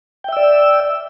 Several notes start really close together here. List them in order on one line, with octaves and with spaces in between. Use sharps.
G5 E5 E6 D5